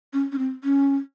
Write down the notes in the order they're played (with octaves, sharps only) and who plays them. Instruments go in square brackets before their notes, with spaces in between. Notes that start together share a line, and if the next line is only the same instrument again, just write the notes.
[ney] C#4
C#4
C4
C#4